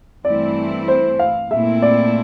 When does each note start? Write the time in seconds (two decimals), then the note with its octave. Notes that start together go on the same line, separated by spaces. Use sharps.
0.25 G2 E3 A3 C4 E4 D5
0.88 C5
1.19 F5
1.51 A#2 A3 C4 E4 E5
1.82 D5